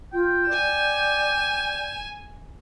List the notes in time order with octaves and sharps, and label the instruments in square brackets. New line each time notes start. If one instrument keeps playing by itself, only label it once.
[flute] F4 [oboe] G5
[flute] D5 [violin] G#5 E7